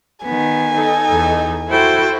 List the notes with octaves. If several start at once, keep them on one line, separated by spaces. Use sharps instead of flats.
D#3 B3 G#5
D#4 A4
E2
E4 F#4 A4 C5 G5